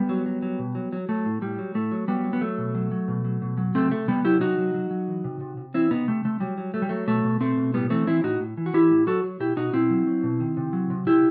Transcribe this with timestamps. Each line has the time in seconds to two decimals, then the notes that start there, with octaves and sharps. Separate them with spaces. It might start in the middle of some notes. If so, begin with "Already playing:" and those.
Already playing: G3 B3
0.09 F#3
0.26 F#3
0.42 F#3
0.59 B2
0.75 F#3
0.93 F#3
1.09 F#3 A3
1.25 A2
1.42 A2 G3
1.59 F#3
1.75 A2 A3
1.92 F#3
2.08 F#3 G3 B3
2.24 F#3
2.33 B3
2.41 F#3 A3
2.58 B2
2.75 F#3
2.91 F#3
3.08 B2
3.25 F#3
3.42 B2
3.58 F#3
3.75 C3 A3 C4
3.91 C3 A3
4.08 C3 G3 B3
4.25 F#3 E4 G4
4.41 C3 D#4 F#4
4.58 F#3
4.74 F#3
4.91 F#3
5.08 E3
5.24 C3
5.41 C3
5.57 C3
5.74 E3 C4 E4
5.91 C3 B3 D#4
6.07 C3 A3
6.25 C3 A3
6.40 F#3 G3
6.58 F#3
6.74 F#3 A3
6.82 G3
6.89 F#3 A3
7.07 B2 A3
7.24 B2
7.41 B2 A3 C4
7.57 B2
7.74 A2 G3 B3
7.90 E3 A3 C4
8.07 E3 C4 E4
8.24 A2 D#4 F#4
8.40 A2
8.57 E3
8.66 F#4
8.73 E3 E4 G4
8.91 A2
9.07 F#3 F#4 A4
9.24 F#3
9.40 B2 E4 G4
9.56 B2 D#4 F#4
9.73 B2 C4 E4
9.90 F#3
10.07 F#3
10.23 B2
10.40 D#3
10.57 C3
10.73 F#3
10.90 C3
11.07 C3 E4 G4